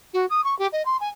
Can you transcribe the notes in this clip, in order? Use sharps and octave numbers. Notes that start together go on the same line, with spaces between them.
F#4
D#6
C#6
G4
D#5
C6
G#5